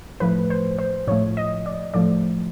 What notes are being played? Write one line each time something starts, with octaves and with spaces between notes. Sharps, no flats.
A2 F3 A3 B4
C5
C5
A2 F3 A3 C#5
D#5
D5
A2 F3 A3 D5